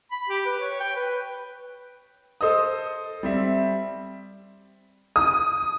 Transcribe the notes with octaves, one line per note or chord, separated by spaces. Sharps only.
B5
G4
B4
C#5
G5
B4
A4 C5 D#5 D#6
G3 C4 E5
D#6